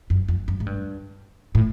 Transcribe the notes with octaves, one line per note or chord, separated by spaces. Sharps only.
F#2
F2
F#2
G#2
G2
A2